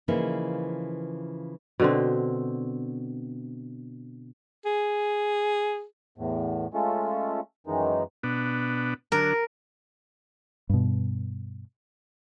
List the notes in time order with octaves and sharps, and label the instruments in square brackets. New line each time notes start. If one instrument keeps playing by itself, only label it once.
[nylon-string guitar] C#3 E3 F3 A#3 D#4 E4
[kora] B2 D3 C4
[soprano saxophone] G#4
[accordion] E2 A2
G#3 A3 C#4 F4 A4
F#2 D#3 E3 G#3 D#4
[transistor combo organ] B2 B3 D4
[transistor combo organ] D3 F#3 D4 [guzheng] A#4
[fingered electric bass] G2 B2